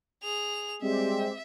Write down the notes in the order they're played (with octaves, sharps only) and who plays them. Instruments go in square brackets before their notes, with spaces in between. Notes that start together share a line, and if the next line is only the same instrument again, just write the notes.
[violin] G#4 F7
[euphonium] G3 [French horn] G#3 [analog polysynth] C4 G4 [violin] E5